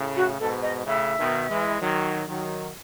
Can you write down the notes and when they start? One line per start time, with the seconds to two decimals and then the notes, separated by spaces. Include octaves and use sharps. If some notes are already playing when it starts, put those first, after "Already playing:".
Already playing: A2 C#3
0.16 F#4
0.40 G#2 B2 A4
0.62 D#5
0.86 A2 C#3 E5
1.18 B2 D#3
1.49 E3 G#3
1.81 D#3 F#3
2.28 D#3 F#3